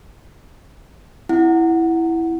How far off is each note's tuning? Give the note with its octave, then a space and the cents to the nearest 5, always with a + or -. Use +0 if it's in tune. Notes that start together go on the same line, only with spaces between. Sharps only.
C4 -5 E4 +0 F#5 +0